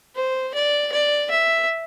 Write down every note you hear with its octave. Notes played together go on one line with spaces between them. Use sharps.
C5
D5
D5
E5